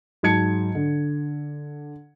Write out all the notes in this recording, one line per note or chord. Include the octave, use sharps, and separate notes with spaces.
G#2 F#3 A5 G#6 C#7
D3